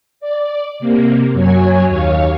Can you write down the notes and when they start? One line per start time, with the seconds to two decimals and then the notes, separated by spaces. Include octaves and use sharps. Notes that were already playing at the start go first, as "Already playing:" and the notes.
0.20 D5
0.79 C3 A#3
1.33 F#2 F#3 C#5 G#5
1.87 D#2 C#5 F5